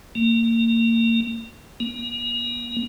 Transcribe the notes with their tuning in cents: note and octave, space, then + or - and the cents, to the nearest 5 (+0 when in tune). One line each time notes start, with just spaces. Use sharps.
A#3 -30
A#3 +40